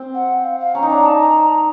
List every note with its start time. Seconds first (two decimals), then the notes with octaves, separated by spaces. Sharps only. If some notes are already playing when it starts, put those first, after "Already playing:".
Already playing: C4
0.14 F#5
0.43 F5
0.59 F5
0.75 C#4 A#5
0.83 D#4
0.89 D4 A#5
1.04 D#4 A5
1.20 A#5